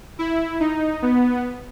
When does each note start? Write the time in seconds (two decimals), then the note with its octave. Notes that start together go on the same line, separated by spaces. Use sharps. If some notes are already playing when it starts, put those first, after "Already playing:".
0.19 E4
0.60 D#4
1.02 B3